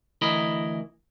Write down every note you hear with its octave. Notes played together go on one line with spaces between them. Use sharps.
D2 E3 E4 A#4 D#5 B5